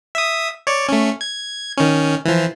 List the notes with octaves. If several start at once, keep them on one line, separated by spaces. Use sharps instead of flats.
E5 D#6
C#5 D5
A3 C#4
G#6
D#3 C#4
E3 F3